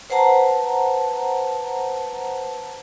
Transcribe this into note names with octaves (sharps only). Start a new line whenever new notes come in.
B4 C5 F#5 A5 A#5